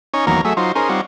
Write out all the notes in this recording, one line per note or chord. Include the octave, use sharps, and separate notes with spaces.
C#4 D#4 C#5
E2 D#3 F#3 A#3 C#5 A#5
F#3 A3 G#4 E5
F#3 D#4 F4 C5
C#4 D#4 G#4 A#4 C5
G3 C4 D#4 F4 C#5 F#5